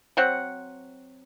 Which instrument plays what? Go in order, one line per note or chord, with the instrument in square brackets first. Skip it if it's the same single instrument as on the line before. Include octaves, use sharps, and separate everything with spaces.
[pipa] F#3 C4 F#5